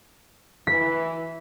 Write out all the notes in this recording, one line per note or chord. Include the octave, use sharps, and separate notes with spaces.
E3 B6